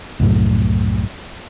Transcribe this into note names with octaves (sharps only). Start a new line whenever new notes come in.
C2 F#2 A2